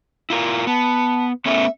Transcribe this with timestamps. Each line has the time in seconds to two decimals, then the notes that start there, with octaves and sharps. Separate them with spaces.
0.30 E4 F4 A#4
0.67 B3 A5
1.46 A3 B3 C#4 E5